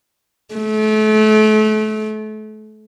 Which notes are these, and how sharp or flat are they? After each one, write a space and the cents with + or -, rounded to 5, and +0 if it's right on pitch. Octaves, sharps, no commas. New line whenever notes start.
A3 -35